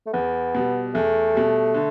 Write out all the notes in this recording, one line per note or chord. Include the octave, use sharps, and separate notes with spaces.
A3
E2 B3
B2 G3
E2 A3
B2 G3
D3